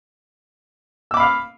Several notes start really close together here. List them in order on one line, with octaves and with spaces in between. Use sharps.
E6 D6 B5 F5 F6